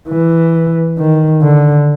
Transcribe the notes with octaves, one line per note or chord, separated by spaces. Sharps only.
E3
D#3
D3